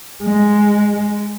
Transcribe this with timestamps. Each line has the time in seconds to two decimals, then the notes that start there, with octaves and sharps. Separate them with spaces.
0.23 G#3